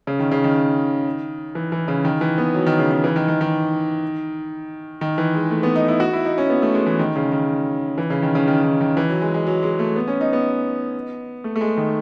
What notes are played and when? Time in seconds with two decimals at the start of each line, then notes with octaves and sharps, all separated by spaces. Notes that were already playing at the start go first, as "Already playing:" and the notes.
0.07 C#3
0.19 D#3
0.32 C#3
0.44 D#3
1.55 E3
1.72 E3
1.88 C#3
2.05 D#3
2.21 E3
2.38 B3
2.54 F#3
2.66 D#3
2.79 C#3
2.92 D#3
3.04 E3
3.16 D#3
3.28 D#3
3.41 D#3
5.01 D#3
5.18 E3
5.35 G#3
5.51 A3
5.63 B3
5.76 D#4
5.88 E4
6.00 F#4
6.13 E4
6.25 D#4
6.38 C#4
6.50 B3
6.62 A3
6.75 G#3
6.86 E3
6.99 D#3
7.16 C#3
7.32 D#3
7.98 E3
8.10 C#3
8.22 D#3
8.35 C#3
8.48 D#3
8.64 D#3
8.81 D#3
8.97 E3
9.10 F#3
9.22 G#3
9.34 G#3
9.47 F#3
9.63 G#3
9.79 A3
9.96 B3
10.08 C#4
10.21 D#4
10.33 B3
11.44 A3
11.56 A3
11.61 G#3
11.77 D#3